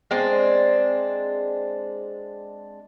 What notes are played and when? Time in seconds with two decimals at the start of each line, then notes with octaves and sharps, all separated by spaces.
0.11 G#3 C4 D4